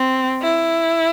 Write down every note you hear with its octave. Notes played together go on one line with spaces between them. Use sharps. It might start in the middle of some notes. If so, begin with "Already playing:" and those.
Already playing: C4
E4